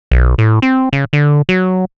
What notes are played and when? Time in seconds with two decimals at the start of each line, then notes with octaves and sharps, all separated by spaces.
0.11 B1
0.38 A2
0.62 C4
0.93 C#3
1.13 D3
1.49 F#3